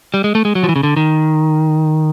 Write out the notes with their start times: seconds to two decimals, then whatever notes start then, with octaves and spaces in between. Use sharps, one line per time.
0.14 G3
0.24 G#3
0.35 A3
0.45 G#3
0.55 F#3
0.64 F3
0.69 E3
0.76 C#3
0.83 D3
0.97 D#3